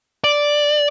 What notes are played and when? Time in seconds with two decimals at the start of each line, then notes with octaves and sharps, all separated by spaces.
0.24 D5